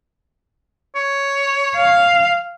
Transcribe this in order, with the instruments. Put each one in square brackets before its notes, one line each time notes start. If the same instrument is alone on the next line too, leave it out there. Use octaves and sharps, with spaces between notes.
[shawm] C#5
[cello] F5